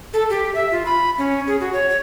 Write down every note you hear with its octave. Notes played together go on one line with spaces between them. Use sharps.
A4
G4
E5
F4
B5
C#4
G#4
F#4
C#5
C#5